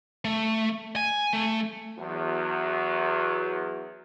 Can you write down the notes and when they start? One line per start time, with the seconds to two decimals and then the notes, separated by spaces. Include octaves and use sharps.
0.25 A3
0.96 G#5
1.33 A3
1.99 E2 F#3